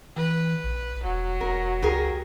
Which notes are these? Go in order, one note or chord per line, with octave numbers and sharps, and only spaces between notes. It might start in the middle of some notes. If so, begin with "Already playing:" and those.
E3 B4
A#1
E1 F#3
E1 A#4
C#2 G4 G#4 A#4